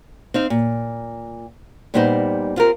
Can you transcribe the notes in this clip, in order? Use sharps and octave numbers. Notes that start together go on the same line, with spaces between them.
C4 D#4 F5
A#2
A#2 G3 B3 D#4 C5
C4 F4 G4 A#4